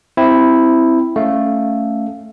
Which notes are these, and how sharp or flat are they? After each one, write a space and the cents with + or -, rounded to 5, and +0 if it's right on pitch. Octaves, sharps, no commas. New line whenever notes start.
C4 +0 E4 +0
A3 +0 C#4 +0 F5 +0